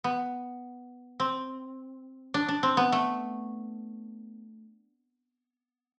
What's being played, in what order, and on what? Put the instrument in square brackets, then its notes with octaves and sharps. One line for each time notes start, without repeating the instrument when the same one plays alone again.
[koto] B3
C4
D4
D4
C4
B3
A3